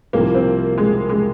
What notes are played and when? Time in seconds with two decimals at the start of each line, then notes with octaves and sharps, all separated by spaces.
0.13 C2 C3 F3 A#3
0.35 C4
0.78 G#3
1.09 G#3